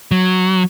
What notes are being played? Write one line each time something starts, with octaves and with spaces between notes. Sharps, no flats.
F#3